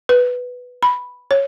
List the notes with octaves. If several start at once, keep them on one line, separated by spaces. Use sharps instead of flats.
B4
B5
C#5